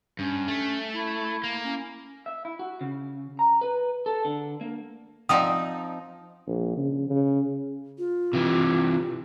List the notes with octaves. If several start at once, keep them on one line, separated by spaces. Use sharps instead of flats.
G2 C#4
A3
E4
A#3
C#4
E5
E4
F#4
C#3
A#5
B4
A4
D3
A#3
F3 C4 D#4 D5 F#5 G5 D#6
A#1
C#3
C#3
F4
C3 E3